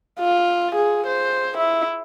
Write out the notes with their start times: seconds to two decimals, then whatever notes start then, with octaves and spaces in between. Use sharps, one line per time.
0.20 F4
0.76 G#4
1.07 C5
1.58 E4